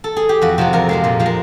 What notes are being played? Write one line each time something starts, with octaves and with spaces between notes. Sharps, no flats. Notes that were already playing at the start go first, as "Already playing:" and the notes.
A4
G#4
G4
F2 F#4
C3 F3 G#3 F#4
F2 A#4
C3 F3 G#3
A#2 A#4
F3 G#3
A#4